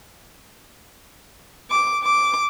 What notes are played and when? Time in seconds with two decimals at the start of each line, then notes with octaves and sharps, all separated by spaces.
1.71 D6
2.04 D6